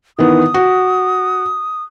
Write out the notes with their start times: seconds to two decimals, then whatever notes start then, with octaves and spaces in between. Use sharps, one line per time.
0.19 D#3 E3 B3 D#6
0.54 F#4